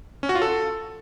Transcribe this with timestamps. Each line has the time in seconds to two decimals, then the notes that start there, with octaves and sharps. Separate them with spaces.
0.23 C#4
0.29 F#4
0.35 F4
0.42 A4